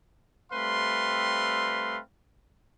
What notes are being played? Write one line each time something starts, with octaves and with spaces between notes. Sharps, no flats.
G3 A3 C4 B4 F5 C6